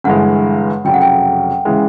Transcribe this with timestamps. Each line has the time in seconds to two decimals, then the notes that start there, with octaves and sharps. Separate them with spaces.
0.04 G1 G2 E3 G#3 F#5
0.85 F1 F2 C#3 F#3 G5
0.94 F#5
1.02 G5
1.65 C#3 E3 G#3